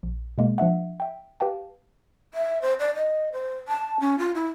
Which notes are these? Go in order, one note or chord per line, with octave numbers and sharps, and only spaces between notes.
A#1
B2 G#3 A#3
F3 D4 E5 F#5
E5 G5
G4 B4 F5 G5 A5
E5
C5
D5
D#5
C5
A5
C#4
F4
E4